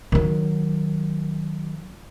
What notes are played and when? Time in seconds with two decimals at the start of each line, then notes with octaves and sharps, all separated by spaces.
0.12 D#3 F#3